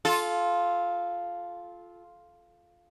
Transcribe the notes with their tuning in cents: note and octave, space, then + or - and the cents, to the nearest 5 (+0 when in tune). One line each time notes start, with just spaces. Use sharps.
F4 +0 A4 -25